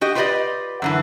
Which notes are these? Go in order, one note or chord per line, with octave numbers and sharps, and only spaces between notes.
F#4 G4 D#5
F4 G4 B4 C5 D5 D#5
F#2 D3 E3